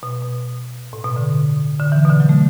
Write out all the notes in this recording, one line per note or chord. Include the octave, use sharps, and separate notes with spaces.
B2
B2
A2
B2
D3
D3
E3
B2
D3
F#3
A3